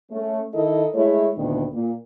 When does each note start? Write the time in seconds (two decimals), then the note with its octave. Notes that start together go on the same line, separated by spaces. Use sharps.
0.11 A3 C#4
0.55 D#3 E4 A4 A#4 D#5
0.94 G#3 A3 E4 C#5
1.37 D2 A#2 D#3 B3 D4
1.74 A#2